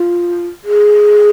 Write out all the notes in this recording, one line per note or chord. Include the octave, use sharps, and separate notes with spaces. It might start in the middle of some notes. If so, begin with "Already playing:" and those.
Already playing: F4
G#4